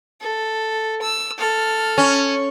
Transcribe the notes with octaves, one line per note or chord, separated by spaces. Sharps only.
A4
E6
A4 F6
C#4